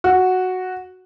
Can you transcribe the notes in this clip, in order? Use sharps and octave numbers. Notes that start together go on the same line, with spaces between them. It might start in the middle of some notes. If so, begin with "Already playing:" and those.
F#4